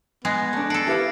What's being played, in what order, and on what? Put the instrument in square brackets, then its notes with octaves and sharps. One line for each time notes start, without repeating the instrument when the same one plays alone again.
[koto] G#3 [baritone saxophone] B3 [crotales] F#6 G#6 A#6
[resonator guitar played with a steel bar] A3 D4
[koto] A4 F#5 [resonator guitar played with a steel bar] A5 [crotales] C7 D7
[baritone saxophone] E4 [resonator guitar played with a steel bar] G4 B4 F5 [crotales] C#7